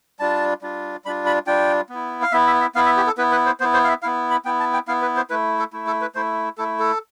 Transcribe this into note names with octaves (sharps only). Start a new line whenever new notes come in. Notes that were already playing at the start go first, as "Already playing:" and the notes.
G3 D4 F4 A5
G3 D4 F4
G3 D4 F4 B5
B5
G3 D4 F4 G5
B3
E4
F5
B3 E4 E5
E5
E5
B3 E4 F5
E5
G4
A4
B3 E4 B4
B4
C5
B3 E4 C5
C5
F5
E5
B3 E4 F5
B5
B3 E4 G5
A5
G5
B3 E4 F5
B4
C5
A3 E4 B4
A4
A3 E4
A4
B4
A3 E4 C5
A3 E4 A4
A4